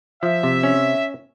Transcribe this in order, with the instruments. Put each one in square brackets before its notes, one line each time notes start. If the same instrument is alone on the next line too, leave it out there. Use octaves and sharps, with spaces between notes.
[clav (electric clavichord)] F3 [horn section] E5
[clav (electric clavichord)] C3
C#4